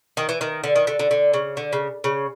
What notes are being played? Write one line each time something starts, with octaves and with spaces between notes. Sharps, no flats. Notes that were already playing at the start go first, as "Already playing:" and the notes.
D#3
E3
D#3
D3
D#3
D3
D3
D3
C#3
D3
C#3
C#3